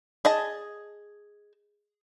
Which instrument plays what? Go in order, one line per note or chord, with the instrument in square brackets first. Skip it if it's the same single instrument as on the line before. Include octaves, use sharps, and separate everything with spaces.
[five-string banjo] G#4 D#5 A5